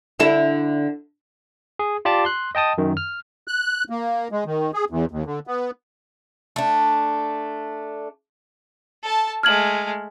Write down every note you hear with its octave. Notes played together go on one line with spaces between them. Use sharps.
D3 E4 A4
G#4
F4 G4 D5 A5 D6
C6 F#6
D#5 G5 A5 D#6
F#2 D#3
F6
F#6
A#3
G#3
D#3
G#4
E2
D#2
D3
B3
A3 D4
A4 A5
G#3 A3 F6 G#6 F#7